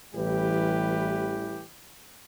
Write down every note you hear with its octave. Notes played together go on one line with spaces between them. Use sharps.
A1 E3 G3 G4 B4